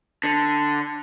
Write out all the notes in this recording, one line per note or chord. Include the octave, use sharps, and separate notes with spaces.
D3